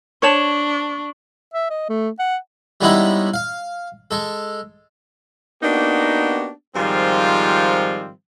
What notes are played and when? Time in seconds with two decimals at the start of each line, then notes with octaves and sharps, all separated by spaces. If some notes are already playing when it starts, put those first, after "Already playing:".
0.22 D4 C5 C#5 A5 C#6 F#7
1.54 E5
1.70 D#5
1.89 A3
2.19 F#5
2.81 G3 G#3 B3 C#4 D#4 E4
3.34 F5
4.11 G#3 A4
5.62 A#3 B3 D4 D#4 F#4 G4
6.76 G#2 D#3 F3 G3 C4 F4